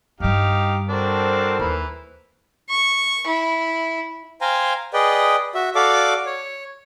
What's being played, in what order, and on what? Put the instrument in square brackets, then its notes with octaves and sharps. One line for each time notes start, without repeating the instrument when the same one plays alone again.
[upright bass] G2 G3 [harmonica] D#4 G4 F5
[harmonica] C4 D4 F#4 [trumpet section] A4 A#4 C5
[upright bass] D#2 [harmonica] E3 B5
[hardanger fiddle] C#6
E4
[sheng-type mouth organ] C5 F5 G5 G#5 A#5
G#4 B4 D5 D#5 G5
F#4 E5
F#4 A4 D5 F5 D6
C#5